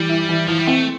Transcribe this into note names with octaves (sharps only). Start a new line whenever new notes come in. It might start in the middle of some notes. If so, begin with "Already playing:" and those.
Already playing: E3 G3
E4
E3
E3 F3
G3
A3 C4